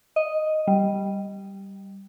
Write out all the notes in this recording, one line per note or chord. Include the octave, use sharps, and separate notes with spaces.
D#5
G3